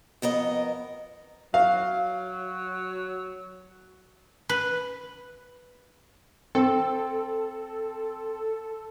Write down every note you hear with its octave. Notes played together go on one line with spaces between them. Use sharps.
F2 B3 A#4 D#5
F#3 F5
B4
C4 A4